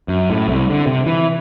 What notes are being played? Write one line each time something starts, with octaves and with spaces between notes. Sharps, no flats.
F#2
A2
C2
D3
C3
E3